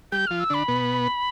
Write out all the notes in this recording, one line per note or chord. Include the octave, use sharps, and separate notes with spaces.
G3 G4 G6
F3 F4 F6
E6
D3 D4 B5
B2 B3